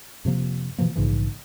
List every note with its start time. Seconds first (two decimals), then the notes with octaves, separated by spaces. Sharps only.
0.25 F2 C3 F3 A#3
0.78 B2 E3 F3 A#3
0.95 A#1 G#2 C#3 E3